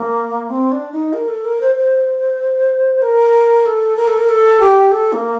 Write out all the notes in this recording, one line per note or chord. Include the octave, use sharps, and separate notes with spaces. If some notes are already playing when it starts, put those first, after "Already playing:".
Already playing: A#3
C4
D4
D#4
A#4
A4
A#4
C5
C5
A#4
A4
A#4
A4
A#4
A4
G4
A4
A#3